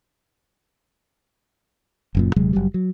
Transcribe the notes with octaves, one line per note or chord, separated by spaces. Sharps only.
F#1 F#2 A#2
D#1 C3 F#3 G#3
F#1 F#3 G3
F#3